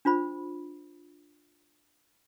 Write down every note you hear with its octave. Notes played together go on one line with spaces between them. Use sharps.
D4 F4 C5 B5